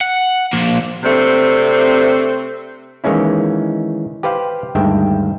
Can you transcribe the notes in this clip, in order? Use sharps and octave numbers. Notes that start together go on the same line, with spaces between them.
F#5
F3 A#3
C3 A3 C4 D4
D#3 E3 G#3 A#3 C#4 E4
G4 B4 C5 F5 G5
D2 G2 D#3 G#3 E5 G5